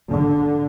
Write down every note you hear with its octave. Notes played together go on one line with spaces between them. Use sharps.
D3